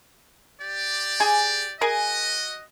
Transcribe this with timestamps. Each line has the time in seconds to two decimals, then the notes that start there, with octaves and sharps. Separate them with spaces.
0.61 G4 D5
1.20 G#4 G#5
1.81 F#4 G#4 A#4 D#5 G#5